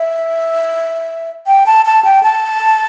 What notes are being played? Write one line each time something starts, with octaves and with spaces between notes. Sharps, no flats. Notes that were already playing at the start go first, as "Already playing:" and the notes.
Already playing: E5
G5
A5
A5
G5
A5